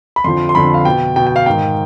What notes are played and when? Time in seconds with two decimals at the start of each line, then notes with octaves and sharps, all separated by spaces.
0.16 B5
0.24 F2 D3 F3 C6
0.49 C6
0.55 F2 D3 F3 B5
0.74 F5
0.85 B2 G5
1.16 B2 G5
1.27 G5
1.36 F5
1.46 G#2 D#3 G5